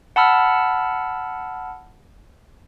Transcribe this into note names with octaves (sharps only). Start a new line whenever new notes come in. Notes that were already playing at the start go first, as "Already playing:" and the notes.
F#5 A5 B5 E6 F6